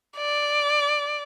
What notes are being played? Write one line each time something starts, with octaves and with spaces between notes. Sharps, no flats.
D5